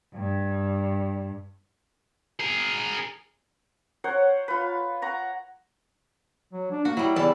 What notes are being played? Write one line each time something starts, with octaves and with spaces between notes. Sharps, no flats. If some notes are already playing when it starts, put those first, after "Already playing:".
G2
G#4 A#4
A#4 C5 C#5 F#5
F4 B4
F#5 A#5 C#6
F#3
D4
A#3 F#4
F#3 G3 E4
E2 E3 E4 D5 A5